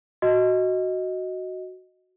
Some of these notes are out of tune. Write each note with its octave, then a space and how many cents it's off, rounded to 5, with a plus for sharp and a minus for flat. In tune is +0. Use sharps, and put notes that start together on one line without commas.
F#4 +0 D#5 +10